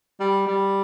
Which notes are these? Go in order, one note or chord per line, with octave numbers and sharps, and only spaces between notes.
G3
G3